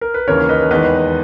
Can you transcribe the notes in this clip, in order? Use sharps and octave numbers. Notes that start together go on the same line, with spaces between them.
A#4
B4
D#2 C#3 E3 A#4 C#5
B4 D#5
E2 D#3 G#3 B4 D#5